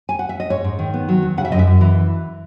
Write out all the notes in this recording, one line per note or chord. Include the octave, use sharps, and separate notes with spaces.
G#5
F#5
E5
D#5
G#2 C#5
G#2
D#3
B3
F#3
E2
C#3 F#5
E5
F#2 D#5
E5
F#2
E3